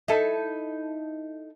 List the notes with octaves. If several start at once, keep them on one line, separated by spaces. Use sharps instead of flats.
D#4 E4 A4